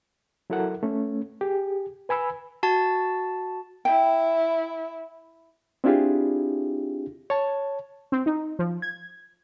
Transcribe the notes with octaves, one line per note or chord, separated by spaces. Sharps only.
F#3 E4 A4 A#4 F#5
A3 C#4
G4 G#4
B4 G#5 B5 E6
F#4 A5 A6
E4 G5
C4 D4 E4 F4 G4 G#4
C#5 A5
C4
D#4
F3
G#6